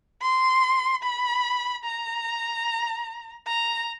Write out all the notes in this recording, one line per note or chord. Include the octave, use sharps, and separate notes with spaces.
C6
B5
A#5
A#5